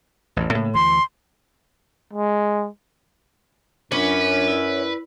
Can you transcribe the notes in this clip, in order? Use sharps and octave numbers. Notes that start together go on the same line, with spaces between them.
A1 E2
A2 C#3 A#3
D2 E3 C6
G#3
F#2 F#3 C#4 D4 F4 B4
E4 D5 E6